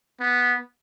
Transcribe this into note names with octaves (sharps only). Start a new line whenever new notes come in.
B3